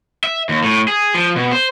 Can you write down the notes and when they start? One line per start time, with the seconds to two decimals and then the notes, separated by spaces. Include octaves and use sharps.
0.24 E5
0.49 D#2
0.64 A2
0.88 G#4
1.14 F3
1.36 B2
1.53 C5